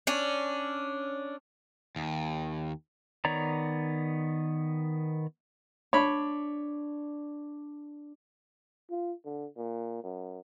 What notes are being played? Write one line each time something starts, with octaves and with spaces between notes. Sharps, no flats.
C#4 D4
D#2
D#3 B3 C#5 D5 A#5
D4 C#5 B5
F4
D3
A#2
F#2